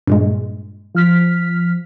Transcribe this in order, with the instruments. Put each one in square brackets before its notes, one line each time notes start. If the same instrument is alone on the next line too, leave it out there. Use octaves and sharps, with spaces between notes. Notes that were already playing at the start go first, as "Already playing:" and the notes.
[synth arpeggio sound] G2 A#2 G#3
[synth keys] F3 F6 B6